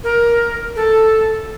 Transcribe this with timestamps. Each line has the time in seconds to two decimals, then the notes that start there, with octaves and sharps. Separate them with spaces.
0.04 A#4
0.76 A4